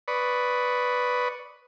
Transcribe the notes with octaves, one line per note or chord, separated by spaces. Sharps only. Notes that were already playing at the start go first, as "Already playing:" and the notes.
B4 D5 B5 C#6 D#6